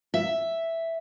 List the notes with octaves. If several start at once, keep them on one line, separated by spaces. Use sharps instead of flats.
E5